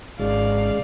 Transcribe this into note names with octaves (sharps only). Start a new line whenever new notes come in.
G#1 C#3 G#3 D5 F5